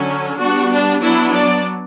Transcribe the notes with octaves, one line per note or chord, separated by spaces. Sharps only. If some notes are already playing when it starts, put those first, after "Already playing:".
Already playing: D3 F#3 C#4
G3 B3 D4 F#4
D4
F#3 B3 D4 E4
D5